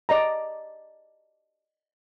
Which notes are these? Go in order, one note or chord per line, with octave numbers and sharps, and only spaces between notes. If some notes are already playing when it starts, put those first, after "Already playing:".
D5 D#5 A#5